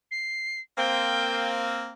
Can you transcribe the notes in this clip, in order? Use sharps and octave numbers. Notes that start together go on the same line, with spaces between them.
C7
A#3 C4 G5